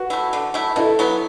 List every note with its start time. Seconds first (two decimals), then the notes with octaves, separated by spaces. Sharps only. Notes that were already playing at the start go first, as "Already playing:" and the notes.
Already playing: F#4 B4
0.10 A3 E4
0.33 D3
0.54 A3 E4
0.76 B2 E4 A4
0.99 F#3 B3